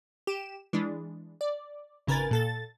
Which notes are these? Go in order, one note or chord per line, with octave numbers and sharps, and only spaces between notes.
G4 E7
E3 G#3 D4
D5
G#1 C#3 A#4 B4 G#5 A6
A#2 A4 A6